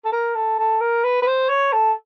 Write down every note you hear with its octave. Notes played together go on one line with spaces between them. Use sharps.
A4
A#4
A4
A4
A#4
B4
B4
C5
C#5
A4